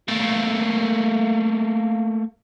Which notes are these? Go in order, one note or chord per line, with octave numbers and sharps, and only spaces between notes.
A3 A#3